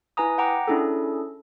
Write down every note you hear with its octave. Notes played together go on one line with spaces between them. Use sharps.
E4 B4 G#5 A#5 D#6
F#5 G5 A#5 D6
C#4 D4 E4 G#4 A4